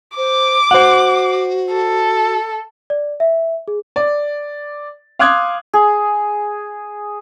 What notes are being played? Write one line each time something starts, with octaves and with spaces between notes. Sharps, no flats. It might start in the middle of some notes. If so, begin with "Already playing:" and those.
C5 D6
F#4 C5 F#5
A4
D5
E5
G#4
D5
F5 C6 D6 D#6 F#6 G#6
G#4